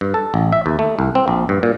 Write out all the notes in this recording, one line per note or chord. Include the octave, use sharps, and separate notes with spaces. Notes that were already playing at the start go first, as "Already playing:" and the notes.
G2
A4
A1
E5
D#2
A3
C2
C4
A#1
G2
A#2